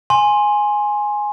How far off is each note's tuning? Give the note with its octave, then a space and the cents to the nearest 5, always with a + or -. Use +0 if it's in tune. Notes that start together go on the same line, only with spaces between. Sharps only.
G#5 +0 C6 +15